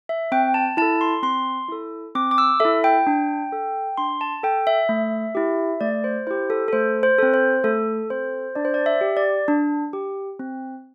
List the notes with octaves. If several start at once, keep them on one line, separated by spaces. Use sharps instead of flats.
E5
C4 G5
A5
E4 A4 A5
C6
C4 C6
E4 A4
C4 D6
D6
E6
E4 A4 E5
G5
D4
A4
D4 C6
A5
A4 G5
E5
A3
E4 G4
A3 D5
C5
E4 G4 C5
A4
A4
A3 C5
C5
C4 A4
C5
A3 A4
C4 A4 C5
D4 D5
C5
D5
E5
G4
D5
D4
G4
C4